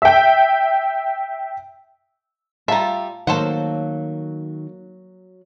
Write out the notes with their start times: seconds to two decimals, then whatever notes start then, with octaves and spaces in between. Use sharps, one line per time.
0.02 E5 G5
2.68 G3 F4 E5 A5 A#5
3.27 D#3 F#3 A#3 A4 C5 F#5